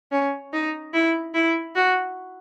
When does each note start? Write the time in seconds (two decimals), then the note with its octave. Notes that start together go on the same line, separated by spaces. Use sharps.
0.12 C#4
0.53 D#4
0.94 E4
1.34 E4
1.75 F#4